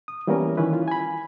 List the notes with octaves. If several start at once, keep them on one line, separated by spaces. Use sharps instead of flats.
D#6
E3 G3 A#3 B3 C#4 A#4
D#3 E3 C#4 E4 B4
F4
G#5 B5